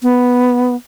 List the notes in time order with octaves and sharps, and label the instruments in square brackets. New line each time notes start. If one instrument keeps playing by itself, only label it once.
[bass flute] B3